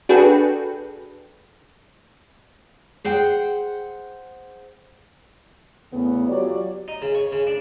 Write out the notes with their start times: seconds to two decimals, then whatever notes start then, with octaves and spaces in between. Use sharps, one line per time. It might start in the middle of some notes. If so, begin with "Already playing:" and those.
0.09 D4 F#4 G#4 A4 B4 G5
3.04 G#4 C5 F#5 G5
5.92 E2 C#3 A3 B3
6.27 F#3 F4 G4 C#5 D5
6.88 D#4
7.02 C#3
7.15 C#5
7.32 C#3
7.47 D4